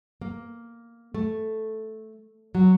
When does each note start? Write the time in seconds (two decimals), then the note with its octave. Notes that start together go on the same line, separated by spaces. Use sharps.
0.21 A#3
1.14 A3
2.55 F#3